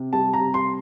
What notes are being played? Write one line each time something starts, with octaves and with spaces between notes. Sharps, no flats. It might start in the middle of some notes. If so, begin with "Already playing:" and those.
Already playing: C3
G3 A5
A#5
C3
C6